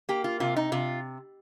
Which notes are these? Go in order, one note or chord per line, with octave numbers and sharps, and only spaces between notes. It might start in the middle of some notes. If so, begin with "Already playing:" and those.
A#3 G4
F4
C3 F4
D#4
C3 F4